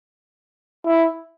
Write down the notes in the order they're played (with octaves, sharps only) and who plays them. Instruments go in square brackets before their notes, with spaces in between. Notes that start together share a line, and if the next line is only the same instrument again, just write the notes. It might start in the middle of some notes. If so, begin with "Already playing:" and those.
[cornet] E4